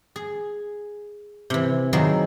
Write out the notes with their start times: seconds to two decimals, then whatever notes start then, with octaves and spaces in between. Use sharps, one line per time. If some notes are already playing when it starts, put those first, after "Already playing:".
0.16 G#4
1.50 C3 E3
1.93 D#3 F#3 A#3 E4 G#4 C5